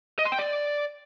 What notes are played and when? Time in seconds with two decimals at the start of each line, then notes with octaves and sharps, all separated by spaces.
0.19 D#5
0.25 C6
0.32 G5
0.39 D5